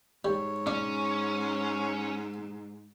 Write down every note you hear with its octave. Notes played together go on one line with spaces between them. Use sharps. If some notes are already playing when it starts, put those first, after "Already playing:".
G#2 G3 C#5
C#4 D4